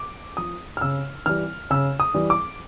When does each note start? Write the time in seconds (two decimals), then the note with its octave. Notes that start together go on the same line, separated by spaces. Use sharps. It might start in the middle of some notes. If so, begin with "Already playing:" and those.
Already playing: D6
0.37 F3 D#6
0.77 F6
0.81 C#3 E6
1.26 E3 G3 F6
1.70 C#3 E6
2.00 D#6
2.14 E3 G3
2.30 D6